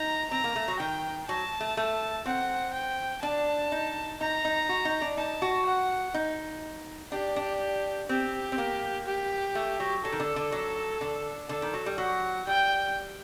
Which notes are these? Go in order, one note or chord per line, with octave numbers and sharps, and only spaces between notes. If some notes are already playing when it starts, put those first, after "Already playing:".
Already playing: D#4 A#5
C4 A#5
A#3
A3
F#3
D#3 G5
F#3 A5
A3
A3
C4 F#5
G5
D4 A5
D#4
D#4 A#5
D#4
F#4
D#4
D4
D#4 A5
F#4
F#5
D#4
D4 G4
D4
C4 G4
C4
A#3
G4
A3
F#3
F#3 A4
D#3
D3
D3
F#3
D3
D3 A4
D#3
F#3
G3
F#3 F#5
G3 G5